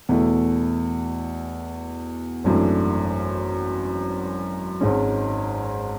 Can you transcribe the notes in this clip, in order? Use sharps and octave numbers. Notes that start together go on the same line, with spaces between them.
E2 B2 A3 E4
G#1 F#2 E3 A3 D4
G#1 G#2 G#3 C#4